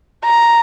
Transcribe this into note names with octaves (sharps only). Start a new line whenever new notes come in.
A#5